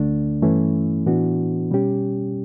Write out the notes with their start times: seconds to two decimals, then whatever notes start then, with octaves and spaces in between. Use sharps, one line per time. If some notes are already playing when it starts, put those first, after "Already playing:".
Already playing: D2 D3 A3 D4
0.42 G2 E3 A3 C#4 E4
1.06 A2 E3 B3 D4 F#4
1.71 B2 G3 C#4 G4